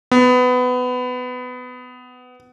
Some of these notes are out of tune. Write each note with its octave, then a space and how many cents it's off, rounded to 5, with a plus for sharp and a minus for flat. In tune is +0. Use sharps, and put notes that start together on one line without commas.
B3 +20